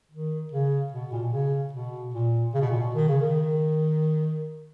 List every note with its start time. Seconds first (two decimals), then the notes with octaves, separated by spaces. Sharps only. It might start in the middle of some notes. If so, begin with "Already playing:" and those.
0.11 D#3
0.51 C#3
0.92 B2
1.12 A#2
1.22 B2
1.33 C#3
1.73 B2
2.14 A#2
2.54 C#3
2.62 B2
2.70 A#2
2.78 B2
2.95 D#3
3.08 C#3
3.21 D#3